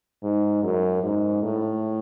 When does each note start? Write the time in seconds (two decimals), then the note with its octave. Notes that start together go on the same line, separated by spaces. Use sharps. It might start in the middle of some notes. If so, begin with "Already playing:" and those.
0.23 G#2
0.63 F#2
1.03 G#2
1.43 A2